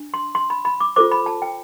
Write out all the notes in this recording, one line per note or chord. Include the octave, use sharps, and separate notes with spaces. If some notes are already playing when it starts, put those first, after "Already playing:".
Already playing: D4
C6
C6
B5
B5
D6
F4 A4 C5 D6
B5
A5
G5